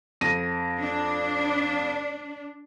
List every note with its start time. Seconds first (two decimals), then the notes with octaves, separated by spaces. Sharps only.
0.21 F2 A#6 D#7
0.79 D4